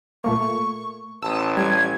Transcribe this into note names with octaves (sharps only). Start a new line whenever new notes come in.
A#2 A3 A#3 C#6
A1 A5 D#6 E6
G3 G#6